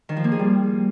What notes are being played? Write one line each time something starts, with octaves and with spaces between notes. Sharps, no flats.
D#3
F3
A#3
G#4
G3